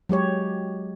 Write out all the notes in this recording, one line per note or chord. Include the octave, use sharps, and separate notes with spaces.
F#3 G#3 G4 C#5